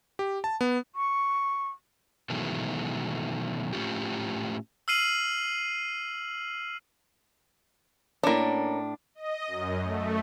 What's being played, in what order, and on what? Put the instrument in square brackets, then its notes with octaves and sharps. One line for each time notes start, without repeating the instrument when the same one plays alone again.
[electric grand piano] G4
A5
B3
[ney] C#6
[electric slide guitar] B2 D#3 E3 F#3 G#3 A3
A2 A3 C#4 F4 G4
[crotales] E6 F6 C7 D#7 F#7
[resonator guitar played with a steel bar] A2 D4 [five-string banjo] A#3 C#4
[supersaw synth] D#5
F#2
A3